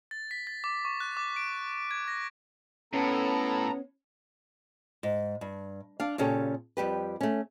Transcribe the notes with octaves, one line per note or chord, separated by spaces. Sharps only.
A6
B6
A6
D6
C#6
F#6
D6
D7
G#6
A#6
A2 B3 C#4 A4 A#5
G#2
G2
D4 F5
A#2 C#3 C#4 G4 A4
F2 G3 G4 B4
A3 C#4